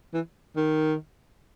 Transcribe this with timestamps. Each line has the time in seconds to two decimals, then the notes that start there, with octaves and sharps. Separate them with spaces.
0.14 E3
0.56 D#3